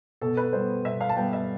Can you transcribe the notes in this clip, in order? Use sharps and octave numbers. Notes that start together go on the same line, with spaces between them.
B2 A4
B4
G3 B3 C5
B2 E5
F5
A5
G3 B3 G5
E5